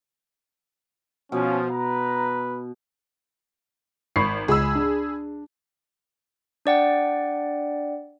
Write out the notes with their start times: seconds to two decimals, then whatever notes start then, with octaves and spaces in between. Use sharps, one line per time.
1.32 B2 F3 C#4
1.70 B4 A#5
4.16 G#1 B5 C#6 C7
4.48 C#2 G#4 B5 E6
4.75 D4
6.66 D4 D5 F#5 G5